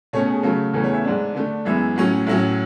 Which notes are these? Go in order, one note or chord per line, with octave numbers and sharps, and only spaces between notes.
B2 A3 C#4 C#5
G#4
C#3 F#3 A3
E2 C#3 E3 A3 C#4 A4
C#5
E5
G#2 G#3 D4
D3 A3 D4
F#2 E3 G#3 B3 E5
A2 F#3 C#4
A2 F#3 C#4 E5